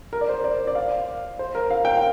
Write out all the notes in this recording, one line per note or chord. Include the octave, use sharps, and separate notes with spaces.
A#4
D5
C5
D5
D5
F5
C5
A#4
F5
G5
F5